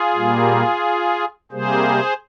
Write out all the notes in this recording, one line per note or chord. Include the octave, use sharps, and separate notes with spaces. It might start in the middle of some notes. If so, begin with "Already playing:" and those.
Already playing: F4 G#4
A#2 G3 A#3
C3 G3 A#3 G#4 C5